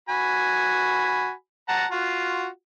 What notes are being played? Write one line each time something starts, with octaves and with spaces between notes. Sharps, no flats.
F#4 G#5 B5
F#5 A5 A#5
F4 F#4